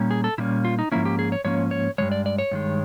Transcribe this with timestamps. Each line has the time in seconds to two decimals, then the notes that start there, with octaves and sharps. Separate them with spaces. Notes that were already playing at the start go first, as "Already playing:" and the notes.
Already playing: A#2 G3 A#3 C#4
0.11 G#4
0.24 A4
0.38 A#2 G3 A#3 C#4 E4
0.65 F4
0.79 D#4
0.92 G#2 F3 A#3 C#4 E4
1.05 G4
1.19 G#4
1.32 C#5
1.45 G#2 F3 A#3 C#4 C#5
1.71 C#5
1.98 G2 D#3 G#3 C#5
2.12 D5
2.26 D5
2.38 C#5
2.51 G2 D#3 G#3